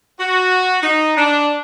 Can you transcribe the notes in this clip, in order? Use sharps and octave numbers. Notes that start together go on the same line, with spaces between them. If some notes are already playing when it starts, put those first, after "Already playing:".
F#4
D#4
D4